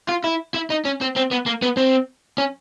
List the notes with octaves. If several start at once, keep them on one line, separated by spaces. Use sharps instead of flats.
F4
E4
E4
D#4
C#4
C4
C4
B3
A#3
B3
C4
C#4